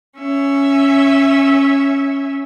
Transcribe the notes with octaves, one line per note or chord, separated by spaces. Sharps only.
C#4 E5